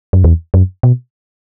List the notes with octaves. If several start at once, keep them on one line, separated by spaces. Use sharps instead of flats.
F#2
E2
F#2
B2